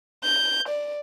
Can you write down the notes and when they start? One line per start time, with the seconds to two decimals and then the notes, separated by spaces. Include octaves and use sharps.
0.24 G6
0.68 D5